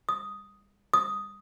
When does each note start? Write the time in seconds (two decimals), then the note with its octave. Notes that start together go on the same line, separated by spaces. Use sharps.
0.09 D#6
0.94 D#6